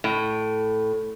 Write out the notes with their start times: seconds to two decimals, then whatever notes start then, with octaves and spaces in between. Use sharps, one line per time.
0.04 A2